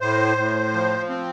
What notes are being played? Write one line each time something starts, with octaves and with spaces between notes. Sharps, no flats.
A2 C5
A2
F3
C4